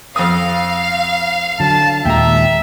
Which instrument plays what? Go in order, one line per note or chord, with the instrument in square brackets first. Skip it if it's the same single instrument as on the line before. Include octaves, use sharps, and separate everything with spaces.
[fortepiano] F2 D#6 [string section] F5
[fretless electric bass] D3 F#3 [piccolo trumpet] A5
[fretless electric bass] D#2 A#2 G#3 [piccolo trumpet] E5 [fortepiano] G5 A#5